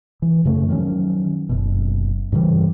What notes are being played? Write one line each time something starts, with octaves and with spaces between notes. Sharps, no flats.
E3
F#2 C#3 A3
D#3 F3 F#3 C#4
F#1 F#2 B2
G2 C#3 E3 G3